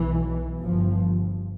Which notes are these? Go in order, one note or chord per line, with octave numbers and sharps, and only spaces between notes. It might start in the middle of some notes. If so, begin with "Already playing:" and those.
Already playing: B1 B2 E3
G1 G2 F3